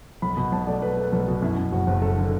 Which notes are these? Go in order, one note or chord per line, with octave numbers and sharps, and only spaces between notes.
B1 B5
B2
B1 A5
A3 D5
A3 B4
A3
B4
B1 A4
B2 F#4
F#2 E4
F#2
F#1 F#4
F#1
F#1 A4
D3